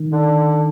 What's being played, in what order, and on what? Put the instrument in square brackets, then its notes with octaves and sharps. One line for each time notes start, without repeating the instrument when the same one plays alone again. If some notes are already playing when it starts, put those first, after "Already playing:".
Already playing: [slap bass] D#3
[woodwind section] D3